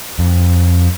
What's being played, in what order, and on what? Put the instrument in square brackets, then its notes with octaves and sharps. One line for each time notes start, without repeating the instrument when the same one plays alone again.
[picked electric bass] F2